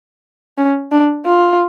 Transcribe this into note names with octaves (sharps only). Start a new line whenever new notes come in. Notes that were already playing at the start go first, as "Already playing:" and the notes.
C#4
D4
F4